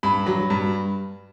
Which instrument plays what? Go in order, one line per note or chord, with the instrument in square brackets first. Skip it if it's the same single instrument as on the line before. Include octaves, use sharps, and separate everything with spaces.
[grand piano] G2 B5
F#3
G2